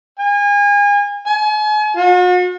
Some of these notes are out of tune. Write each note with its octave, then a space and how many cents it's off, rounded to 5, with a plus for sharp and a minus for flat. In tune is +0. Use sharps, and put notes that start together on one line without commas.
G#5 -30
G#5 +40
F#4 -45